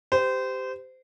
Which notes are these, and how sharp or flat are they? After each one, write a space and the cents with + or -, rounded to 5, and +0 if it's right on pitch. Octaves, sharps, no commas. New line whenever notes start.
G4 +0 C5 -25